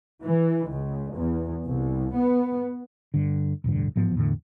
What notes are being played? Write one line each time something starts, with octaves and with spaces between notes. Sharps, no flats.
E3
C#2
E2
C2
B3
G2 D3
E1 A1 G2 D3
A1 G#2 F3 B3
E2 A2 D3